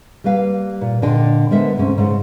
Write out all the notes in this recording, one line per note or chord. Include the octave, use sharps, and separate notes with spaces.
G3 A#3 B4 F5
A#2
A#2 D3 D4 D#5 G5
D3 G#3 B3 A#4 C5 E5
D2 G#2 C3 C#4
G#2 C#3